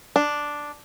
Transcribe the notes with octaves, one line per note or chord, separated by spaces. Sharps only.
D4